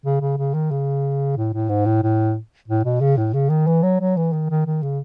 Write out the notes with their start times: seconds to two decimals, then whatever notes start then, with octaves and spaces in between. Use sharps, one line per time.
0.05 C#3
0.21 C#3
0.38 C#3
0.54 D#3
0.71 C#3
1.37 A2
1.53 A2
1.69 G#2
1.85 A2
2.02 A2
2.68 A2
2.84 B2
3.00 C#3
3.17 A2
3.33 C#3
3.50 D#3
3.67 E3
3.83 F#3
4.00 F#3
4.17 E3
4.32 D#3
4.50 D#3
4.66 D#3
4.83 C#3